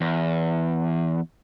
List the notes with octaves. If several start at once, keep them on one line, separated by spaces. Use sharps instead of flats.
E2